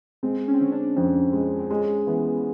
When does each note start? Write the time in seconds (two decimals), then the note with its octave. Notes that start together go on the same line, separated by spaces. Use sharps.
0.23 G#3 C4
0.48 C#4
0.54 C4
0.60 D3 C#4
0.72 D4
0.97 F2
1.33 G#3
1.59 C4
1.70 G#3 C#4
2.07 E3 B3